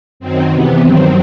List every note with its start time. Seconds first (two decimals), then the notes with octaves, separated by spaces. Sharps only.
0.20 F#2 D#3 F#3 C4
0.50 E2 C3 E3 B3
0.80 G2 D#3 F#3 C4